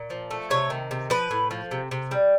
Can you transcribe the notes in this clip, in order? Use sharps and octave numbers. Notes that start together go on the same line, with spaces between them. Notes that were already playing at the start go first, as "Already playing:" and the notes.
Already playing: A#2
F3
A3
C3 C#5
D#3
C3
F3 B4
A2
F3
C3
C3
G3